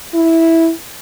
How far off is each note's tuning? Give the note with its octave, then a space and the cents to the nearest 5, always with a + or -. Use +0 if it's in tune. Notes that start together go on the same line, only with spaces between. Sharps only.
E4 -5